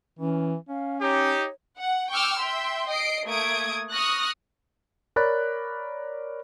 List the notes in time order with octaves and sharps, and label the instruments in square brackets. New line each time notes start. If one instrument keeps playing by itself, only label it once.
[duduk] E3 [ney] C#4
[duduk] C#4 [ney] F5
[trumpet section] D#4 G4 [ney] C#5
[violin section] F#5
G5 C#6 D6 E6 F6
E5 G5 C6
D#5 C7 D7
A3 A#3 D#6 G#6 D7
C#6 D#6 F6 F#6 A#6
[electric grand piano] A#4 C#5 D5 B5 F#6 A6